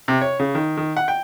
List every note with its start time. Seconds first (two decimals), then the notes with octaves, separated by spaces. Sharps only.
0.08 C3
0.21 C#5
0.40 C#3
0.55 D#3
0.77 D#3
0.97 F#5
1.08 G5